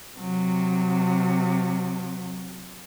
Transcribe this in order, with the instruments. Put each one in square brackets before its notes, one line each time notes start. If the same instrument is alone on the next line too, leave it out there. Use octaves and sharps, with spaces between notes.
[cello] C3 F#3